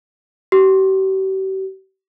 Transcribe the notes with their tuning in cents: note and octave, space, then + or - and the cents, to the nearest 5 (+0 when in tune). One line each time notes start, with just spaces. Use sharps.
G4 -40